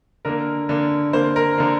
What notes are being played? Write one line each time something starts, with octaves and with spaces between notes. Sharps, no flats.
D3 A#3 A#4
D3 A#3
D3 A#3 C5
A#4
D3 A#3